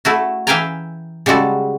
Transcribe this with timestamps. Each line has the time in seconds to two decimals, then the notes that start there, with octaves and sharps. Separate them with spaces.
0.05 A3 E4 F#4
0.47 E3 E5 F5 G5 G#5 A#5
1.26 C#3 G3 G#3 F#4 A4